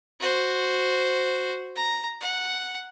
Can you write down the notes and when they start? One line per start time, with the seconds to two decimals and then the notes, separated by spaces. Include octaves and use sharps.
0.20 F#4 C5
1.76 A#5
2.21 F#5